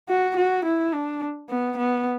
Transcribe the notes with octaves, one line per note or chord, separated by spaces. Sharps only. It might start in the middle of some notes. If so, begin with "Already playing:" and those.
F#4
F#4
E4
D4
B3
B3